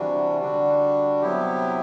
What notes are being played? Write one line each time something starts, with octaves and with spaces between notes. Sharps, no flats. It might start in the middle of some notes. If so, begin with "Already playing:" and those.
Already playing: C3 E3 G3 D4 F#4
D3 G3 D4 F#4
C3 F#3 B3 E4 G4